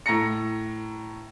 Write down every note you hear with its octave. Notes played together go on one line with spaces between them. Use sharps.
A2 A#5 A#6 C#7